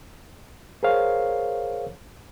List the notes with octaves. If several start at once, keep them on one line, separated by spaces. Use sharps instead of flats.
G#4 A#4 C5 C#5 F5